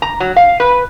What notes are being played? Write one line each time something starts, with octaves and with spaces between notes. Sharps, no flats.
A#5
F#3
F5
B4